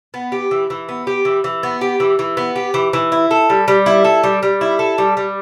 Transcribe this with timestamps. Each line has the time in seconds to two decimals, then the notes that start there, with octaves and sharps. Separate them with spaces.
0.14 B3
0.32 G4
0.51 E3
0.70 E3
0.89 B3
1.07 G4
1.25 E3
1.44 E3
1.63 B3
1.81 G4
2.00 E3
2.19 E3
2.37 B3
2.56 G4
2.74 E3
2.93 E3
3.12 E4
3.31 A4
3.50 G3
3.68 G3
3.86 E4
4.04 A4
4.23 G3
4.43 G3
4.61 E4
4.79 A4
4.98 G3
5.17 G3